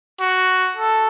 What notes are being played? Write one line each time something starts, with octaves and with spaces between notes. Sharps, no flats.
F#4
A4